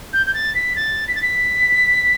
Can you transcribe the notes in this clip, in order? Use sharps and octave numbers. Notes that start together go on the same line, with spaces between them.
G6
G6
A6
B6
A6
B6
A6
B6